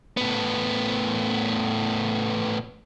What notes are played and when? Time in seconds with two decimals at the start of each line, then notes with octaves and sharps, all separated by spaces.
0.17 A2 B3